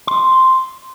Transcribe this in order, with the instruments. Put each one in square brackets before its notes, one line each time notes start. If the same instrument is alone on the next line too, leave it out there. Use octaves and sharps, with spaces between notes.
[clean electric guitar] C6